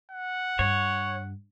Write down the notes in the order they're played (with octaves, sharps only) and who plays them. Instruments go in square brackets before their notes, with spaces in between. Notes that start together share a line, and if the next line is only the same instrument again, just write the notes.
[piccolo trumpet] F#5
[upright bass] G2 [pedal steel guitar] C#5